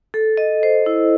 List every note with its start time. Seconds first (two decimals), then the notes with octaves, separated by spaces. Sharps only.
0.14 A4
0.37 D#5
0.63 C5
0.86 E4